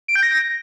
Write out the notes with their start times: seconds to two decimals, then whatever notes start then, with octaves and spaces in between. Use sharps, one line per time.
0.08 D7
0.16 G6
0.23 A#6